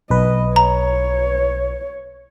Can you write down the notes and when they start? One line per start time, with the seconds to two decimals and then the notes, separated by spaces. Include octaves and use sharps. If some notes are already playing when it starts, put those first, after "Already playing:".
0.10 B1 B4 D#5
0.56 C#5 A#5